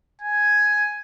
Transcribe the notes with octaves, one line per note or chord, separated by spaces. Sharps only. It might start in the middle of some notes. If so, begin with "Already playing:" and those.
G#5